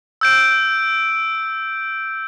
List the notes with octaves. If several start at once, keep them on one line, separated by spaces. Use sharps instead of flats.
E6 G6 D7